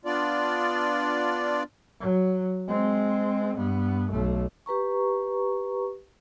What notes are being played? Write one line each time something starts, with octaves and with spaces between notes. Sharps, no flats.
B3 D4 F4 D5
F#3
G#3 C4
G2 B3
B1 A3
G4 B4 A#5 C#6